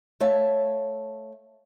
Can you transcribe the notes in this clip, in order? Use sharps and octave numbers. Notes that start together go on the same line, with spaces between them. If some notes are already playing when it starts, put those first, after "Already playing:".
A3 C#5 E5 F5 A5